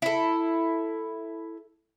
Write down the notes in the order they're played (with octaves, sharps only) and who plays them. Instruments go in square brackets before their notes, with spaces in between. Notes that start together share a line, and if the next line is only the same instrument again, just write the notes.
[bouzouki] E4 A4